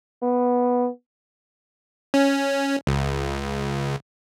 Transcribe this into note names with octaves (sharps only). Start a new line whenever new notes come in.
B3
C#4
C#2